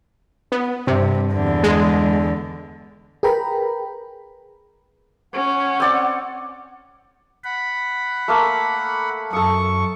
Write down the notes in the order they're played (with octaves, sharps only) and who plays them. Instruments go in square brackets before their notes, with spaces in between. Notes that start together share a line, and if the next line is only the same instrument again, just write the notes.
[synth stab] B3
[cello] G2 [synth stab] C3
[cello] E2 D3
[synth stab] G#3
[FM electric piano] G#4 A#4 B4 G5 A#5 B5
[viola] C#4 [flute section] F#5
[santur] C4 D5
[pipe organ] F#5 B5
[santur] A3 A#3 A4
[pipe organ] F#2 C#6 [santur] A4 D#6